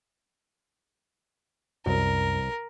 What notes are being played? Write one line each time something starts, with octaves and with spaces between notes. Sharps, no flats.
C2 F#2 A#4